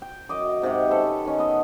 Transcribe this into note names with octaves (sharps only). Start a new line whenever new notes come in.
G5
F#2 D#5 D6
G#2 C3 G4 F#5
C#4 A4 B4
D#3 C#4
B3 D#5